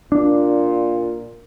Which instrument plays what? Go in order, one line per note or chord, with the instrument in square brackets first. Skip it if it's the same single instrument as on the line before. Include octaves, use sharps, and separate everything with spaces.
[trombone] A#2 [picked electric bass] D4